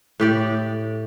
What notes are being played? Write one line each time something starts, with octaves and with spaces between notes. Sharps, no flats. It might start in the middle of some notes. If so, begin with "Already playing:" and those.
A2 G4 D5